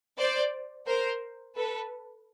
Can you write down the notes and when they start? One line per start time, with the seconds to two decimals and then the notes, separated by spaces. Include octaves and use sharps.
0.18 C5 D5
0.86 A#4 C5
1.56 A4 B4